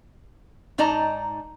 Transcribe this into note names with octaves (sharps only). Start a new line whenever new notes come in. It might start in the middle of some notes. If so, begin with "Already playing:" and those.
G#2 D#4 D5 A5 A#5